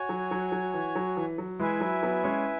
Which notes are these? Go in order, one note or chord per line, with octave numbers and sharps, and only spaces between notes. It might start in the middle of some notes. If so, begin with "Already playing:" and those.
Already playing: F#4 C#5 G#5
F#3
F#3
F#3
E3
F#3
E3
F#3
E3 G#3 E4 B4 E5 G#5
F#3
F#3 B3
G#3 C#4